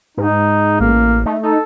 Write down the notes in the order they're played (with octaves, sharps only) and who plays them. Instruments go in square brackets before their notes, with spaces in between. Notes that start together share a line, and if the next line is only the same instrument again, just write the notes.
[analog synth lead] G#2 [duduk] D#4
[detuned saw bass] A1 [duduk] A#3
[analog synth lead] A3 [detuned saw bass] D#4
[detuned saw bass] D#4 [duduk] A4